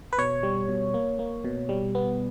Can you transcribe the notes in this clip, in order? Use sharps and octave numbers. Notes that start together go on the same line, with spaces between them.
B4
B2 C#5
G3
B2
A#3
A#3
B2
G3
B3